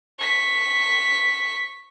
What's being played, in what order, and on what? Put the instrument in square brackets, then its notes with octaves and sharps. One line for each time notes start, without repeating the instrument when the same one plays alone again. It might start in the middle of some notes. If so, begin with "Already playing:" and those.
[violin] C#6 B6